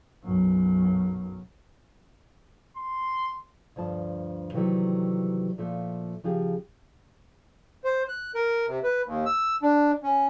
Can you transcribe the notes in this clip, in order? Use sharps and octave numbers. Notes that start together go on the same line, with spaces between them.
B1 F#2
C6
D2 G2 F3 A5
C3 D#3 E3 F#3 G3 A3
A#2 F3 A3
C#3 F3 G4 G#4
C5
F#6
A#4
C3
B4
D#2
E6
D4
C#4